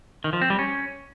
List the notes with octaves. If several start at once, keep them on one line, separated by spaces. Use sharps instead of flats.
D#3
F3
C4
G3
C#4